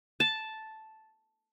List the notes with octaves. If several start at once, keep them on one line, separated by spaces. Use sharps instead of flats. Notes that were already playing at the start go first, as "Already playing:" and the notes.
A5